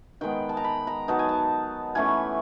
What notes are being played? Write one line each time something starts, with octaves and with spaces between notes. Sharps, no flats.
D#3 G#3 B3 G5
A5
A#5
B5
A#5
F#3 B3 D#4 A5
G#5
A5
E3 A3 C#4 E4 G#5